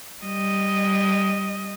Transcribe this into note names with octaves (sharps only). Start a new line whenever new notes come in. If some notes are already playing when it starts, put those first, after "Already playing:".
G3 D#5